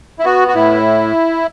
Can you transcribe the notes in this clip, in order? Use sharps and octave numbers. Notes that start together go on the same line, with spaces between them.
E4
B3 F#4
F#4
A2 E4